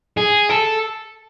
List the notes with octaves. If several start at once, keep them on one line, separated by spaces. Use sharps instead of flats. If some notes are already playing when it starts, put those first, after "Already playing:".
G#4
A4